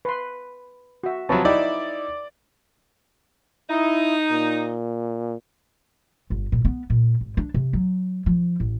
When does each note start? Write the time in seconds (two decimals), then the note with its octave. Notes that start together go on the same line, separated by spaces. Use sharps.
0.05 B4 C6
1.04 F#4 E5
1.29 C3 F3 F#3 B4 C#5 A5
1.45 D#4 E4 D5 E5 G5
3.70 D#4 E4
4.31 A#2
6.30 G1
6.52 A#2
6.65 B3
6.90 A#2
7.21 G#1
7.37 D4
7.54 C3
7.73 F#3
8.26 F3
8.60 A1